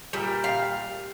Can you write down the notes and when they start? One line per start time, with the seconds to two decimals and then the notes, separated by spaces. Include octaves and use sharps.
0.13 A#2 G3 G5
0.44 F5